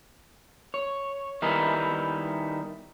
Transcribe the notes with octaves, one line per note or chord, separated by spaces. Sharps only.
C#5
D#3 G3 B3 D#4 E4